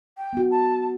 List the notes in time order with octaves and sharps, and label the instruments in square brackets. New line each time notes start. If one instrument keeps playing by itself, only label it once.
[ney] G5
[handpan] B3 F#4
[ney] A5